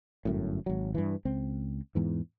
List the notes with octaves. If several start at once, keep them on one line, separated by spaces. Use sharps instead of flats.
G1 F#2 A2
G#1 F#3
G2 E3
C#2 C4
E2 G#2 E3